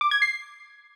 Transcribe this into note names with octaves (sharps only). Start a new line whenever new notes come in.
D6
G#6
C7